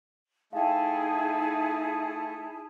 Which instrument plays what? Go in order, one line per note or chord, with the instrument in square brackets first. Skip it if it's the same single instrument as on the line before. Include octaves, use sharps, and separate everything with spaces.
[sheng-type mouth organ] A3 [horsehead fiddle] D#4 [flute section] E4 G#4 A5 [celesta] F5 G5